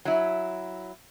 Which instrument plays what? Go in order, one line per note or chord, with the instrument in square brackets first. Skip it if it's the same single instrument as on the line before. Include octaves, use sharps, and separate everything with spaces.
[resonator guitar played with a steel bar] F#3 E4